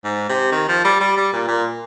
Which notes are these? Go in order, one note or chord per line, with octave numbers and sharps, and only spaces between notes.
G#2
C3
D#3
F3
G3
G3
G3
A#2
A#2